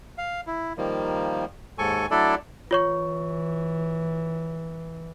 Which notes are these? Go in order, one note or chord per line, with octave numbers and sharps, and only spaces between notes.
F5
E4
D#3 F3 G3 A#3
D#2 G#2 A4 G#5 C#6
F#3 A3 D4 E4 A4 D5
E3 F4 C#5 C#6